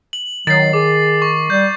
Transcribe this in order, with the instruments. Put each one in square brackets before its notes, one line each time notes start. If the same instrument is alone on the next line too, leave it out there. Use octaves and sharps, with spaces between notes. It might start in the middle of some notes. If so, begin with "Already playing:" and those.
[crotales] F#7
[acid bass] D#3 [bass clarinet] F#3 [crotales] A6 C7
[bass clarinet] G#4 [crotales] D6
[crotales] C#6
[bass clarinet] G3 [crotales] G6